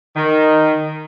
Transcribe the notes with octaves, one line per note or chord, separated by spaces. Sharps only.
D#3